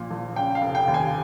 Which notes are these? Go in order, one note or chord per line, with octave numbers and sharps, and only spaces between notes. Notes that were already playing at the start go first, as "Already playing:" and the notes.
Already playing: A#1 A#2
A#1
C#3 G5
F5
F1
G5
D#2
G#5